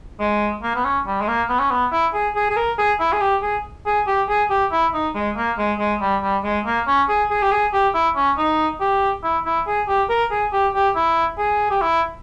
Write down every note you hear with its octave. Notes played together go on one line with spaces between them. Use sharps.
G#3
A#3
B3
C#4
G3
G#3
A#3
B3
C#4
B3
E4
G#4
G#4
G#4
A#4
G#4
E4
G#4
G4
G#4
G#4
G4
G#4
G4
E4
D#4
G#3
A#3
G#3
G#3
G3
G3
G#3
A#3
C#4
G#4
G#4
G4
G#4
G4
E4
C#4
D#4
G4
E4
E4
G#4
G4
A#4
G#4
G4
G4
E4
G#4
G4
E4